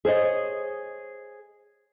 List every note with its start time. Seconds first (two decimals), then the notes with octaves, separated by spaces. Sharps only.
0.05 G#4 C5 C#5 D#5